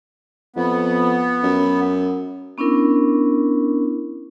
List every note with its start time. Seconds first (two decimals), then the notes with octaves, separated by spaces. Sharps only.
0.56 F2 B3
1.43 F#2
2.58 B3 C#4 D4 E4 A#4